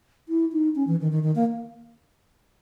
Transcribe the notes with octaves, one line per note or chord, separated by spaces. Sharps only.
E4
D#4
C#4
E3
D#3
D#3
D#3
A#3